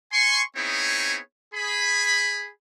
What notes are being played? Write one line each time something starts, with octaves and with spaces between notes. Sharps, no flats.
G#5 C6 C#6
B3 C4 D#4 E4 G#4 C#5
G#4 B5